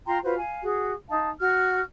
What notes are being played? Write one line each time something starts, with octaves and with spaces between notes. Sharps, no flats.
F4 G5 A#5 C6
F4 F#4 B4 C5
F5 G#5
F#4 G#4
D#4 F5 A5
F#4 F6